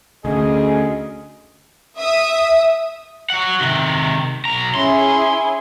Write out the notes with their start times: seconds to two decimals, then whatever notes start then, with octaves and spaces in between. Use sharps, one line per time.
0.25 D2 C#4 G#4 D#5
1.98 E5 D#6
3.30 F#3 F#5
3.60 C3 D#3
4.45 B1 A#5
4.75 C#4 E4 G#4 C6